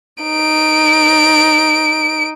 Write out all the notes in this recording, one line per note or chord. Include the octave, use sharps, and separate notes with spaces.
D#4 D7